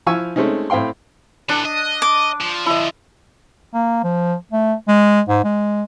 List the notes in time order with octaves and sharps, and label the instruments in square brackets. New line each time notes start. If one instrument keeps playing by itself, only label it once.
[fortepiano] F3 E4 F5 G#5 C#6 E6
G#3 A3 C4 C#4 D#4
A2 C4 F5 G5 C6
[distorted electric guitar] E3 A4 [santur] D4
[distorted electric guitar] D#5
[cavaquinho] D6
[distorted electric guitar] F3
[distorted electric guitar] D3 F3 [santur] E4 D#5
[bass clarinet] A#3
F3
A3
G#3
G#2
G#3